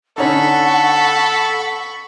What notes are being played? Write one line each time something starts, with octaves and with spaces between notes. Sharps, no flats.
D3 C#4 D#4 A4 F#5 B5 C#6